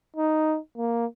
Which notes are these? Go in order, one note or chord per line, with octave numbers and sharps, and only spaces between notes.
D#4
A#3